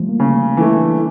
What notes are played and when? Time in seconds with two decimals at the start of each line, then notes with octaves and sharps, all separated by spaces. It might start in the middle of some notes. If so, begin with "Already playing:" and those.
Already playing: F3 G3 A3
0.09 A#3
0.19 C#3 C#4
0.39 C#4
0.57 E3 A3 C#4
0.77 D4